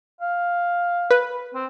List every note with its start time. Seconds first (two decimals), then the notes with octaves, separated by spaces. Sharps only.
0.21 F5
1.11 B4
1.54 C4